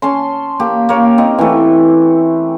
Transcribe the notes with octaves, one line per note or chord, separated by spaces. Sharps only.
C#4 A5 C6
A#3 G4
A#3 C#5
C4 D#4
E3 A3